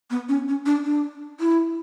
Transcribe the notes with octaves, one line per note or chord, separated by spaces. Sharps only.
B3
C#4
C#4
D4
D4
E4